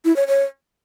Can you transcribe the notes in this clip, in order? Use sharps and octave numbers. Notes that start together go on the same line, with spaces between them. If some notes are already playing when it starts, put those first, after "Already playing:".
E4
C#5
C#5